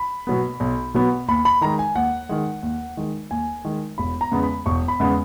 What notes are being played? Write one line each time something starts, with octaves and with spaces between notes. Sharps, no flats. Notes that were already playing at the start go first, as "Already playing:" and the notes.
Already playing: B5
B2 F#3 B3
B1
B2 F#3 B3
D#2 B5
B5
D#3 G#3 A#5
G#5
D#2 F#5
D#3 G#3
D#2
D#3 G#3
D#2 G#5
D#3 G#3
E1 B5
A#5
E2 C#3 G#3 B3
B5
E1 C#6
B5
E2 C#3 G#3 B3